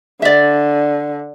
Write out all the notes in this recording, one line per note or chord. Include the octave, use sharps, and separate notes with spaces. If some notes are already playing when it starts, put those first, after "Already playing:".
D3 D5 E5